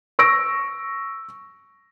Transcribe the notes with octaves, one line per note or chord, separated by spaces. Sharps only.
C#6 E6 A#6 D7